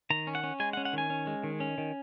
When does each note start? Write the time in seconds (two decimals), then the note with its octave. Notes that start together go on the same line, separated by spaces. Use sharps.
0.10 D#3 A#5
0.27 C#4
0.35 F#5
0.43 C#4
0.60 G#3 G#5
0.73 F#5
0.77 C#4
0.85 F#5
0.93 D#3 G#5
1.10 C#4
1.27 G#3
1.44 D#3
1.60 C#4
1.78 D#3